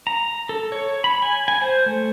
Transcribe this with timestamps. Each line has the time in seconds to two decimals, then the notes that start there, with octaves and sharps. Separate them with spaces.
0.07 A#5
0.49 A4
0.72 C#5
1.04 B5
1.22 G#5
1.48 G#5
1.61 C5
1.86 A3